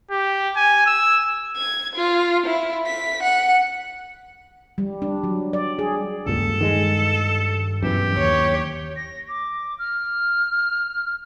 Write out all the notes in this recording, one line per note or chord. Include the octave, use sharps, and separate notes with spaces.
G4
G#5
E6
G#6
F4
E4
B6
F#5
G3
D4
F#3
D5
G#4
D#1 C#2 G2 A#2 A4
D#3 G#3
F#2 B2 E3 G4
D#2 C#5
A#6
D6
F6